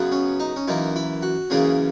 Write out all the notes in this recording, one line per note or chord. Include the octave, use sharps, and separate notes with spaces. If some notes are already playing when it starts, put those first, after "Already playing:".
Already playing: F#2 C#3 F#3 B3
C#4
D#4
C#4
F#2 E3 A#3 D#4
E4
F#4
F#2 C#3 E3 A#3 C#4 G#4